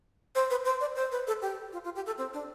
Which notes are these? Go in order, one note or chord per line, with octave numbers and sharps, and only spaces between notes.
C5
B4
C5
D5
C5
B4
A4
G4
F4
F4
G4
A4
C4
D4